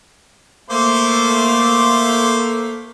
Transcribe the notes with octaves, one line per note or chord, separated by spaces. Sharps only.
A3 A#3 C5 C6 D6